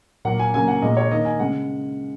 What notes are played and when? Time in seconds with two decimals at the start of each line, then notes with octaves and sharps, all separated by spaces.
0.25 A#2 F#3 A#3 F#5
0.39 G#5
0.54 C#3 F#3 A#3 G#5
0.68 F#5
0.82 A#2 G#3 D#5
0.97 C#5
1.11 D#3 A#3 D#5
1.25 G#5
1.39 C#3 G#3 F#5